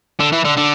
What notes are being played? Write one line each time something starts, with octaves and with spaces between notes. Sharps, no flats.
D3
E3
D3
D3